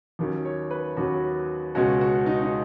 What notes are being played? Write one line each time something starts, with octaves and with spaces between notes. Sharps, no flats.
D#2 D#3 F#3 C#4
C#5
B4
D#2 D#3 F#3 C#4 F#4
C#2 B2 G#3 C#4 F#4
F#4
D#4
D#4